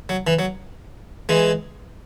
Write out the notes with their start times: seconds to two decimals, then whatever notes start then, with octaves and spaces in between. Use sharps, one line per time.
0.09 F#3
0.27 E3
0.39 F#3
1.29 E3 G#3